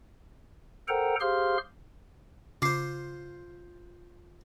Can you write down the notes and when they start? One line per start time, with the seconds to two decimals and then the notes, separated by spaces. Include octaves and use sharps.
0.88 A4 A#4 C5 F#5 G5 A#5
1.20 G4 G#4 C5 F5 C6 F6
2.62 C#3 F4 C5 D6 C7